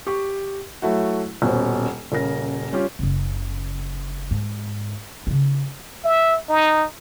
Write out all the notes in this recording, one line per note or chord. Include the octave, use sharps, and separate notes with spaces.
G4 C#6
F#3 A3 E4 F#4
D#1 B2 C#4 C5
D#1 C#3 A#4 A#6
G3 C#4 F4 G4
F#1 C#3
G#2
C#3 D#4
E5
D#4